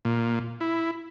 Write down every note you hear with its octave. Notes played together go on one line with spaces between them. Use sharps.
A#2
E4